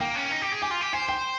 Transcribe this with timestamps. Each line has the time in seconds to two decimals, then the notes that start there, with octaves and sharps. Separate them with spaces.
0.01 A#3 G5
0.15 C#4
0.31 D#4
0.42 G4
0.52 G#4
0.62 G4 G#5
0.71 F4
0.81 G4
0.93 C5 G#5
1.09 C5 G5